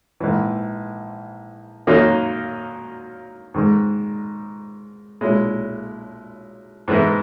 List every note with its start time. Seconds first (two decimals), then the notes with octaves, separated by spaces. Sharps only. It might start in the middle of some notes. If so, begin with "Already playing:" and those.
0.20 A#1 G#2 E3
1.87 F#2 D#3 F#3 A#3 D#4
3.54 G#2 D#3 G#3
5.21 B1 A#2 G#3 C#4 E4
6.88 G#2 E3 G#3 B3 E4